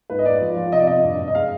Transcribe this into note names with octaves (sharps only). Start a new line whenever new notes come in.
G#2 B4
D#5
G#2 D5
F3
F3
C3 D#5
D5
C3 D#5
G2
G2
D#5
G#3 F5